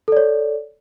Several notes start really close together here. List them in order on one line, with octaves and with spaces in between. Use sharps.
A4 D5 C#5